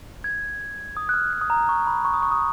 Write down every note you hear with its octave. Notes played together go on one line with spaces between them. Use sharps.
G#6
D#6
F#6
F6
F#6
D#6
A#5
C#6
B5
C#6
D#6
C#6
D#6